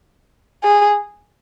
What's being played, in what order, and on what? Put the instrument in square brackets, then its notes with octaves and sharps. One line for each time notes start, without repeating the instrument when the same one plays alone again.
[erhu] G#4